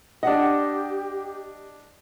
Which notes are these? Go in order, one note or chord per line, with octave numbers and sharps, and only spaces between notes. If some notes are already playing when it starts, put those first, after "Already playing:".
D4 G4 D#5 F#5